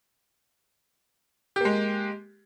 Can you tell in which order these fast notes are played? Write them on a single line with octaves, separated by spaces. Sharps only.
G4 A#3 G#3